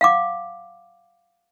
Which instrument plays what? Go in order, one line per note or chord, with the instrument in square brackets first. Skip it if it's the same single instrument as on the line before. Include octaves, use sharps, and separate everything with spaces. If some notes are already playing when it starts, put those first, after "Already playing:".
[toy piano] F5 F#5 D6